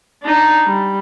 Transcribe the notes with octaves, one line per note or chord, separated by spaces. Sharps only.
D4 D#4
G3